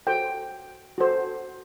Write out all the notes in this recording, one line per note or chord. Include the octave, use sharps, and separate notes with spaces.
F#4 A4 C5 G5
F#4 A4 C5